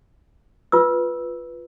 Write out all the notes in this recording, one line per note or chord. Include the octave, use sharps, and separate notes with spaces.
F4 B4 E6